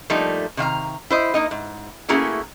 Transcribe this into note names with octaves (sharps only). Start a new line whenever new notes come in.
F3 G3 A3 A#3 D#4
C3 D#3 F5 A#5
E4 C5 D#5
A#3 D#4 D#5
G#2
A3 A#3 C#4 E4 F#4 G#4